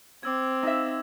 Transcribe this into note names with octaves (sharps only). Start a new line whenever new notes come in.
C4 D6 E6 G#6
D#4 E5